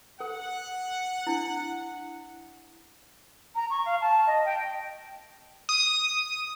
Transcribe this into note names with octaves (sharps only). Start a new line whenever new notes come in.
A4 F#5
D4 E4
A#5
C#6
F5
A5
D#5
G5
D#6